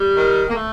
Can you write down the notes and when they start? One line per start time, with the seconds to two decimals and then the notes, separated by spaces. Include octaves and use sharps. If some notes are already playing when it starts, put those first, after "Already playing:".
Already playing: G3
0.16 D#3
0.49 A#3
0.53 A3